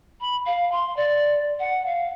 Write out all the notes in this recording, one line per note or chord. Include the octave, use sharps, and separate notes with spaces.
B5
F5
C6
D5
F#5
F5